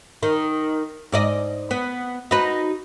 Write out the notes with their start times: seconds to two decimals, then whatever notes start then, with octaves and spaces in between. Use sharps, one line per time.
0.23 D#3
1.12 G#2 D5 D#5
1.71 B3
2.31 D#4 F#4 B4